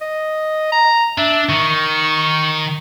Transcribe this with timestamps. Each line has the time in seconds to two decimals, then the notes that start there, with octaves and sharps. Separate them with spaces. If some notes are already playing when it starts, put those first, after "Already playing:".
0.01 D#5
0.72 A#5
1.18 D4 E5
1.49 D#3 C#6